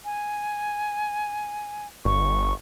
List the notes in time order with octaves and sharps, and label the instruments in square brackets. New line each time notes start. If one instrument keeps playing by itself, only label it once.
[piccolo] G#5
[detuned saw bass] G1 [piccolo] C#6